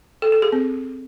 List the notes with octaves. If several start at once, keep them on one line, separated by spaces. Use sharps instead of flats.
A4
A4
G#4
C4